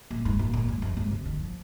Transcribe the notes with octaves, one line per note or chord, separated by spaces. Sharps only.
A#2
G#2
A#2
A#2
G#2
F2
G#2
C3
D#3
F3